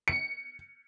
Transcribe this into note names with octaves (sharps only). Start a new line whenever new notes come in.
C#7